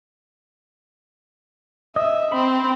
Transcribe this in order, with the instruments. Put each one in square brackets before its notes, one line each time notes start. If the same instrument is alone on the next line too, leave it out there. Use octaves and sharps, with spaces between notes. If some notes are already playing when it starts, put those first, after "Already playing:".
[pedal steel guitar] D#5 [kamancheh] E5
[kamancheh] C4 [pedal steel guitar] B5